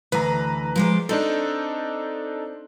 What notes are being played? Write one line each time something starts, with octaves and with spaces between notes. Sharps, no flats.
D2 E3 B4 A#5
F3 G#3 D5
C4 D4 D#4 A4